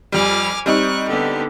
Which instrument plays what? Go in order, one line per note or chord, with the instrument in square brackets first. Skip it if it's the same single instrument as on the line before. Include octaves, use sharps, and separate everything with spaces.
[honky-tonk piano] F2 G3 [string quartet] G#5 D6 F6
[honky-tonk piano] G3 C4 D#4 [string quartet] C#6 F#6
[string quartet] D3 B3 G4